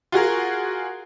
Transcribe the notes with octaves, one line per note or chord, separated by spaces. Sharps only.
F4 F#4 G#4 A#4